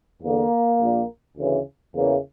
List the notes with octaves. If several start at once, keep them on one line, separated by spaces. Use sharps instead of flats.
E2 D3 A#3
A#1 A#2
D2 C#3 E3
E2 C#3 E3 A#3